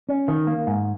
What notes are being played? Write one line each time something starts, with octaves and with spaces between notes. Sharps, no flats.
C#4
D#3
A#3
G#2